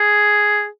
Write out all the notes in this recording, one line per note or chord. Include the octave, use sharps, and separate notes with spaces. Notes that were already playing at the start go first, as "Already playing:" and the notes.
Already playing: G#4